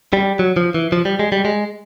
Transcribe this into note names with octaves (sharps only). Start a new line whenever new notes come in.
G3
F#3
F3
E3
F3
G3
G#3
G3
G#3